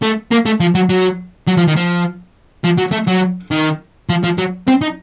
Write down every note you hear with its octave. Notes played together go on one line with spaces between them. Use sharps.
A3
A#3
A3
F3
F#3
F#3
F#3
F3
D#3
F3
F3
F#3
A3
F#3
D#3
F3
F3
F#3
C4
D#4